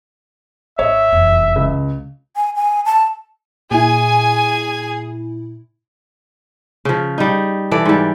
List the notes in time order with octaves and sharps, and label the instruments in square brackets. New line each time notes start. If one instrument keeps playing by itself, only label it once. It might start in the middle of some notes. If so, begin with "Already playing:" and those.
[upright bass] G#1 [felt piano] C#5 D#5 [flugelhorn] E5
[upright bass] F1 E2
[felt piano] C#2
[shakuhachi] G#5
G#5
A5
[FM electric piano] A#2 E4 [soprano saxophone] G#4 [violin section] G#5
[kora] C#3 F3
G3 D#4
E3 A4 D5
G#2 G3